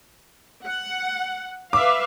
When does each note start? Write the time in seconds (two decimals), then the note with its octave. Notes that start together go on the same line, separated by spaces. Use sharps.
0.66 F#5
1.73 B4 E5 F5 D6